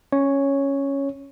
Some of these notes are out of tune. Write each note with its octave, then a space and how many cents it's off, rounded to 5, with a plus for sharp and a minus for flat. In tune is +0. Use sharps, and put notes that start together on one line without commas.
C#4 -5 C#5 +0